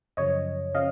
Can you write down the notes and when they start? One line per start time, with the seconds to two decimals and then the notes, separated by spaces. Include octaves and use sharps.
0.17 F#2 C#3 F3 C#5 D#5
0.75 C#3 F3 D#5 F5